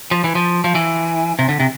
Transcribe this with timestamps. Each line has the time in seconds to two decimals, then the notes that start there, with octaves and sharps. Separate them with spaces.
0.11 F3
0.24 E3
0.35 F3
0.64 F3
0.75 E3
1.39 C3
1.49 D3
1.60 C3